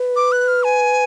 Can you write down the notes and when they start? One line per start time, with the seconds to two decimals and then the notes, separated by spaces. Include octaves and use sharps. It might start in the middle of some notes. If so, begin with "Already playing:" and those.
Already playing: B4
0.16 D6
0.32 F#6
0.48 F6
0.64 G#5